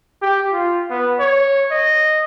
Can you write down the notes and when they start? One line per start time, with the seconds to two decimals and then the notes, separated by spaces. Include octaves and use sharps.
0.22 G4
0.53 F4
0.90 B3
1.19 C#5
1.71 D#5